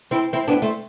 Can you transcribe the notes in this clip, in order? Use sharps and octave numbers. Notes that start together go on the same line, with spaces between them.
C4 E4
C4 E4
B3 D4
A3 C4